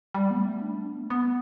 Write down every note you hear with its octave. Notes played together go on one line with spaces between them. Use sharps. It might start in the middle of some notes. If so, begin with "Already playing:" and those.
G3
B3
A3
D4
B3
A3
B3